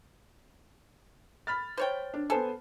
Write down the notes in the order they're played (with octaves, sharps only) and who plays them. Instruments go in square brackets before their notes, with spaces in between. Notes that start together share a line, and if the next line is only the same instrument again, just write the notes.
[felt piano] B5 F6 A6
[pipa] C5 C#5 G5
[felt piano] D4
[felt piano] B3 C5 G#5 [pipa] A4